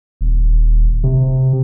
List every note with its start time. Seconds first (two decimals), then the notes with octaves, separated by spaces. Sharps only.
0.21 D#1
1.04 C3